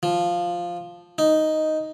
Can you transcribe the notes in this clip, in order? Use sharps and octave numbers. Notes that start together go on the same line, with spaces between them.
F3
D#4